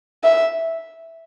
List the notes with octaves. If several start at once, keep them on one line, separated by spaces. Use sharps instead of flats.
E5